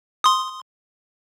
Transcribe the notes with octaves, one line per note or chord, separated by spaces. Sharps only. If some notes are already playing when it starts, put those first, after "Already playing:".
C6 D#6